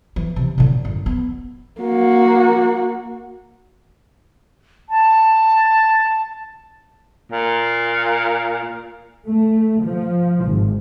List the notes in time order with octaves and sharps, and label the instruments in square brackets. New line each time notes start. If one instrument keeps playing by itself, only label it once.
[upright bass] E3
C3
A2 D3
F#2
B3
[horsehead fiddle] A#3 F#4
[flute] A5
[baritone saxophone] A#2
[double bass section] A3
F3
G#1